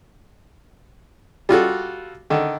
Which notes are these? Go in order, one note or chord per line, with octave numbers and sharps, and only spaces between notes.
G3 F4 F#4 A4
D3 D#3